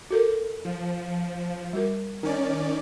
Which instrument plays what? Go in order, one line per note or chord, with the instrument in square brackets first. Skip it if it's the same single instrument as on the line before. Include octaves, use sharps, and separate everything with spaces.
[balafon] F#4 A4 A#4
[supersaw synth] F3
[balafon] G3 F#4 A#4
[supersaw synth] D#3 C#4 D5